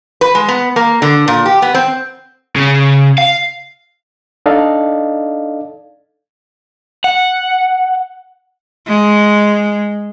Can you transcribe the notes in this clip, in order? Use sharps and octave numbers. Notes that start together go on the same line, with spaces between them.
B4
G#3
B3
A#3
D3
A#2
G4
B3
C4
C#3
F5
D4 D#4 A4 D5 D#5 F5
F#5
G#3